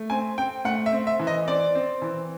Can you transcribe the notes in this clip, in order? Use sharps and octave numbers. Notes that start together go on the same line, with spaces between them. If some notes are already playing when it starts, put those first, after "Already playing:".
Already playing: A3
C4 G#5
C4 G5
A3 F#5
E5
C4
E5
E3
D#5
C4 D5
C4
E3